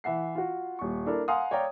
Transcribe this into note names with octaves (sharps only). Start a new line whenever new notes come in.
E3 E5 F#5 C7
F4 F#4
D#1 C#6
D4 E4 A4 A#4
F5 F#5 G#5 A#5 C6 D#6
C#5 D5 F5 G5 A#5